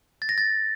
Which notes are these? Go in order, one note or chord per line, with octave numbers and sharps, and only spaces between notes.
A6
A#6
A6